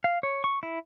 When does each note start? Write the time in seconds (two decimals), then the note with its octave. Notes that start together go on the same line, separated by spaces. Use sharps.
0.04 F5
0.23 C#5
0.44 C#6
0.63 E4